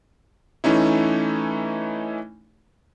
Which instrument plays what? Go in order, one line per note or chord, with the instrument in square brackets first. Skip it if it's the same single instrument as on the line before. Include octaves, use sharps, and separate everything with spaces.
[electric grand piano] E3 A3 C#4 D#4 E4